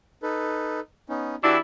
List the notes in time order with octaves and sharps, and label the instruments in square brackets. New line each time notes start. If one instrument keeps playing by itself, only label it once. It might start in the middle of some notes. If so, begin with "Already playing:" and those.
[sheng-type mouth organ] D#4 A4 B4
B3 C#4 D#4
[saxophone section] E3 D4 E4 [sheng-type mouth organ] F#4 G4 E6